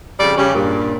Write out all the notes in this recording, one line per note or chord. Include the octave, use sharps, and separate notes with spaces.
F2 C#3 G3 D5
C#3 G3 C#4
G2 A#2